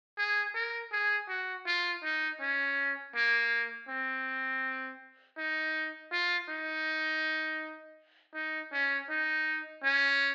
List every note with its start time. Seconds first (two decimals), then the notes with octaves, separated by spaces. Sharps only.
0.18 G#4
0.55 A#4
0.92 G#4
1.29 F#4
1.67 F4
2.04 D#4
2.41 C#4
3.15 A#3
3.89 C4
5.38 D#4
6.12 F4
6.49 D#4
8.35 D#4
8.73 C#4
9.10 D#4
9.84 C#4